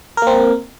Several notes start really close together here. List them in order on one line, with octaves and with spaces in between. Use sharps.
A#4 A#3 C4